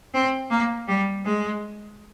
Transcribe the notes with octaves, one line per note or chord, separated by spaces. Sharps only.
C4
A#3
G3
G#3